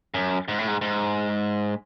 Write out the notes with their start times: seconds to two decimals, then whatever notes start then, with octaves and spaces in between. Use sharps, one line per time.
0.14 F#2
0.48 G#2
0.58 A2
0.67 G#2
0.81 G#2